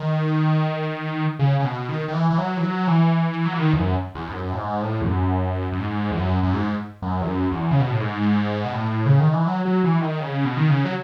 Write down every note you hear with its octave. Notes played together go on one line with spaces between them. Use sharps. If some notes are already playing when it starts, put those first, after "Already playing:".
Already playing: D#3
C#3
C#3
B2
D#3
D#3
E3
E3
F#3
E3
F#3
E3
F#3
E3
D#3
E2
F#2
E2
G#2
F#2
A2
G#2
A2
E2
F#2
F#2
G#2
E2
F#2
F#2
G#2
F#2
E2
F#2
E2
C#3
B2
A2
G#2
B2
A2
C#3
D#3
E3
F#3
F#3
E3
D#3
C#3
B2
D#3
C#3
F#3